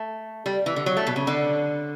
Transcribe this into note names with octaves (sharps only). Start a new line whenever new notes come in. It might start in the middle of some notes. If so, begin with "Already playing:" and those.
Already playing: A3
G3
E3
D3
F#3
A3
B2
C#3
D3